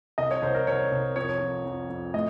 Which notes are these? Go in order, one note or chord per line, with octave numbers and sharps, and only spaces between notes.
C2 D#5
C#5
C2 C5
A#4
C2 C#5
C2
F2 C#5
F2
F2
F2
A2 D#5